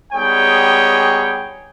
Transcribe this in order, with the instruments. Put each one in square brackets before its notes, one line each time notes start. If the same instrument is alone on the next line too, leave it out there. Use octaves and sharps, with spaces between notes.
[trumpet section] G3 B3 D#4 G#4 C#5 G5